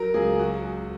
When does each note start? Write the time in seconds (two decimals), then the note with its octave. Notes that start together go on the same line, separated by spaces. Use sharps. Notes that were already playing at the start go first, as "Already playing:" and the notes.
Already playing: F#3 A#4
0.14 C#2 G#4
0.39 F#3 F#4